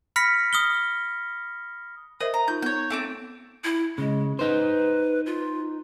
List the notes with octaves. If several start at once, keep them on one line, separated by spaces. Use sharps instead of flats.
B5 F6 A#6 B6 C#7
D#6 F6 G7
A#4 C5 D#5 E5
A#5
D#4 F4 G6
B3 C#5 G6
A3 C4 D6
E4
C#3 G#3
D#4 B4 C5
F4